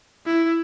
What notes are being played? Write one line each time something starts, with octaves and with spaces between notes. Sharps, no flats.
E4